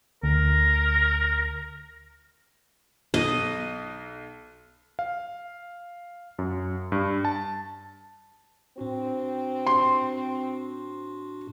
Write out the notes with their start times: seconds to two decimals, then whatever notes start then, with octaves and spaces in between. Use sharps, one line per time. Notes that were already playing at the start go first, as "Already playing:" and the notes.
0.23 D2 A#4
3.14 B1 D#5
4.99 F5
6.39 F#2
6.92 G2
7.25 A5
8.78 A2 C4 D4 F#4
9.67 C6